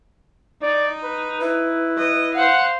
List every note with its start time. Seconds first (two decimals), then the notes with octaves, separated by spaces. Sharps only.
0.62 D#4 D5
1.03 B4
1.41 E4 B4
1.97 D#5
2.35 C5 F5 F#5